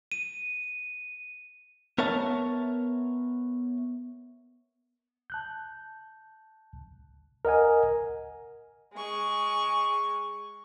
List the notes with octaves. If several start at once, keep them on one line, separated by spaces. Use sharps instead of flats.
D#7
B3 A#4 C#5 E5 A5
A5 F#6 G6
A#4 D#5 F#5 G#5
G#3 C#6